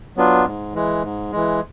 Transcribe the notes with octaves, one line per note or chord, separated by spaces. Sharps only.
F#3 B3 D4 F4
G#2
E3 G#3
G#2
E3 G#3